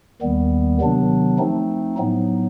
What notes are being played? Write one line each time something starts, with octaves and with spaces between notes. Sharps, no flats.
D#2 D#3 G3 B3
C3 D#3 F#3 B3 D4
F3 A3 C4 D#4
A2 F#3 B3 D#4